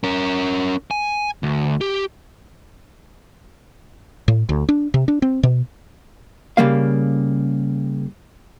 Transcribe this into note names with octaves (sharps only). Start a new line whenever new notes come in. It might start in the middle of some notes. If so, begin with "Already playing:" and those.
C#4 A#4
G#5
D2
G4
A2
D2
D4
C3
D4
C4
B2
C#3 G3 A#3 F5